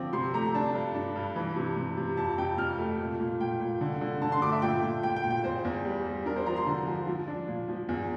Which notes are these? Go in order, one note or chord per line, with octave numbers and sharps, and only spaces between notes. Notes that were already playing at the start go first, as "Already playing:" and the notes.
Already playing: D3 F3 C4 D6
C3 C6
A3 A#5
D4 A5
G2
D4
G2
E3
C3
C3
C3
F2 A5
F2 G5
F2 F6
A3
A#2
A#2
A#2 G5
A#2
D3
D3
D3 A5
C6
A3 D6
E5
A#2 G5
A#2
A#2 G5
G5
A#2
G5
E2 C5
E2
G3
G3
D4 A#4
C5
F3 A#5
C6
D3
F3
F3
D4
A#2
F3
E2